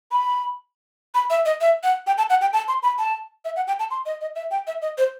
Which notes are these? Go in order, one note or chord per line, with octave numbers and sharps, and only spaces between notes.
B5
B5
E5
D#5
E5
F#5
G5
A5
F#5
G5
A5
C6
B5
A5
E5
F#5
G5
A5
C6
D#5
D#5
E5
G5
E5
D#5
C5